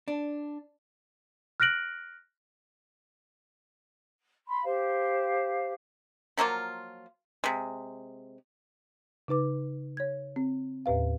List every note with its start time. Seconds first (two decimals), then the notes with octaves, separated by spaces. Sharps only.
0.08 D4
1.60 F6 F#6 A#6 D7 F#7
4.47 B5 C6
4.64 G4 C5 F5
6.37 F3 F#3 A#3 F4
7.44 C3 G#3
9.28 C#3 D#4 B4 D6
9.97 C#5 G#6
10.36 C4
10.86 D#2 A2 B4 F5